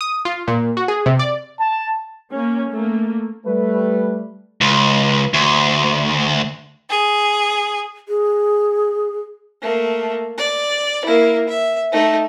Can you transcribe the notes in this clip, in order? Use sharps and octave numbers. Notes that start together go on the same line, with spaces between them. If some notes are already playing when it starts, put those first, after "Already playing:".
D#6
F4
A#2
F#4
G#4
C3
D5
A5
A#3 C#4
A3 A#3
G3 A3 B4
C#2
D2
G#4
G#4
A3 A#3
D5
A#3 E4
E5
A3 D#4